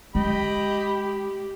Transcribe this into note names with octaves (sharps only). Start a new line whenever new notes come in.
G#3 G4 D#5 G5 B5